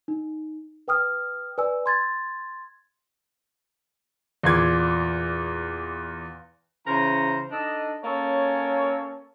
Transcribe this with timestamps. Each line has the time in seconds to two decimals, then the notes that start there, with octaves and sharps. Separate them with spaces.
0.08 D#4
0.88 B4 G5 D#6 F6
1.58 B4 D5 G#5 E6
1.86 C6 G#6 A6
4.43 E2 A#2 G#6
6.86 C#3 E3 C5 A#5
7.51 D4 D#4 A4 D#5
8.04 A#3 C#4 A4 C#5